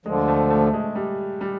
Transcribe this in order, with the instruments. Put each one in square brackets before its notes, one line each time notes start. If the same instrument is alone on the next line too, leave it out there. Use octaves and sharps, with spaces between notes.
[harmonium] D2 D3 F3 [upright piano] G#3
[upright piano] A3
A3
G#3
G3
G3